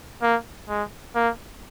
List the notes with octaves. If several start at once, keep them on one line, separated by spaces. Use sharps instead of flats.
A#3
G#3
A#3